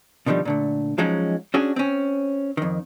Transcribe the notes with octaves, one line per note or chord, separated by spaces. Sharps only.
B2 D3 D#3 F3 G3
A#2 D3 A3
F3 F#3 G#3 C#4 D#4 F#4
C#4 D4 F#4 G#4
C4 C#4
F2 D#3